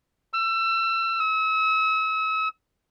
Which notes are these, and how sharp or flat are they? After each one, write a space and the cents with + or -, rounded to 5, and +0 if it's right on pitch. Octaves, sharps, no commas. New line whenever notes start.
E6 +30
E6 -40